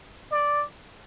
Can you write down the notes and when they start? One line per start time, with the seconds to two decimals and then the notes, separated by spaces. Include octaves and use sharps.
0.31 D5